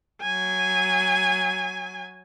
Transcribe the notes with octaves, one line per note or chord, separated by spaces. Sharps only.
F#3 G#5